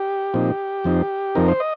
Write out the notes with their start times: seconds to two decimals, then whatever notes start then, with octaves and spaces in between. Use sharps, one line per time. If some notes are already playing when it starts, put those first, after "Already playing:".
Already playing: G4
0.34 A#2 F3 C4 D#4
0.84 F2 F3 C4 D#4
1.35 F2 F3 C4 D#4 A#4
1.48 C5
1.60 D#5